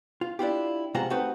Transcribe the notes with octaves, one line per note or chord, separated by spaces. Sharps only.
F4
D4 E4 F4 G4
C3 G#3 F4 C5 F#5 A#5
A3 C4 D#4 F#4 G4 B4